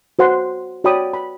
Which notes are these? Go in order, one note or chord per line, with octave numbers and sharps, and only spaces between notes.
F#4 C5 F#5 C6
F#4 C#5 D5 G5 B5 D#6
B5